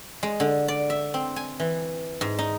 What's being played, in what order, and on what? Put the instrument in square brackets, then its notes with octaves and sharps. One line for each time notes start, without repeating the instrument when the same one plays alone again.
[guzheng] G#3
D3
D5
E5
C4
G#5
E3
G#2
D#4